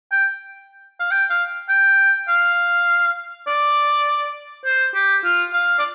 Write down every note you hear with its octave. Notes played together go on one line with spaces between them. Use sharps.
G5
F5
G5
F5
G5
F5
D5
C5
G4
F4
F5
D5